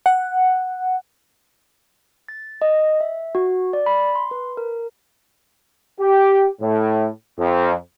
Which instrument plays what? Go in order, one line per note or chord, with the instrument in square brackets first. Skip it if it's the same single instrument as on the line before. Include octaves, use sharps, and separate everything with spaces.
[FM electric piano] F#5
[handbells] A6
D#5
E5
F#4
D5
B5
C6
B4
A#4
[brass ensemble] G4
A2
F2